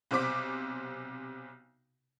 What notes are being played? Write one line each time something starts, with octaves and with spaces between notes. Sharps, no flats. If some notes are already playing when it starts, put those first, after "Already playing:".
B1 C3 C5 D6 B6